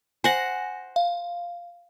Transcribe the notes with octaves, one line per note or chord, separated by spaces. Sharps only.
C5 F#5 G#5 A#6
F5